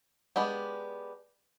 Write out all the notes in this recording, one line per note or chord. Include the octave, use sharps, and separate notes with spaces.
G#3 B3 D4 G4